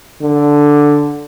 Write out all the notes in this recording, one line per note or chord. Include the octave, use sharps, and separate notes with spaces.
D3